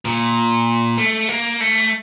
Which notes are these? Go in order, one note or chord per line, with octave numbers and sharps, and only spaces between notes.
A#2
A3
A#3
A3